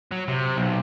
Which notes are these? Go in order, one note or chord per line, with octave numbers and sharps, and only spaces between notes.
F#3
C3
B1